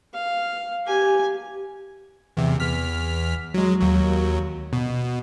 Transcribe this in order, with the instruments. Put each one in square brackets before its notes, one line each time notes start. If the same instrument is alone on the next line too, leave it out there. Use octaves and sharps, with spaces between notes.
[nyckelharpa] F5
G4 G#5
[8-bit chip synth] E2 C3
E2 F6 B6
F#3 G#3
D#2 F#3
B2